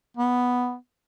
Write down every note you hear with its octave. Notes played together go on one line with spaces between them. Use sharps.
B3